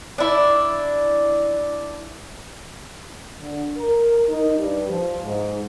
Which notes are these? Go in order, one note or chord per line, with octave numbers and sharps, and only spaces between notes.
D4 E4
D3
A#4
D#4
G2
F3
G#2